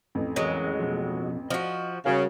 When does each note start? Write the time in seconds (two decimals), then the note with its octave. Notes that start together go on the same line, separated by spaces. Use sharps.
0.15 A1 F2
0.36 E2 F#3 G#3 A#4
0.80 B2 F3
1.50 F3 F#4 D#5
2.06 C#3 G3 F#4 A#4